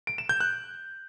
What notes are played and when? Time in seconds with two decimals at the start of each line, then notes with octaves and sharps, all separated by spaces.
0.07 D7
0.18 E7
0.29 G6
0.41 F#6